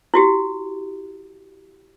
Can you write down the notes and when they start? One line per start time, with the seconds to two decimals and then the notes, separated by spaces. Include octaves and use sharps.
0.14 E4 F#4 G4